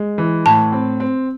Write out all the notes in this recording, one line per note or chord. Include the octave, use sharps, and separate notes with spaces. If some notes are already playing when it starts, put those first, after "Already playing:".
Already playing: G#3
E3
A2 A5
C4
C4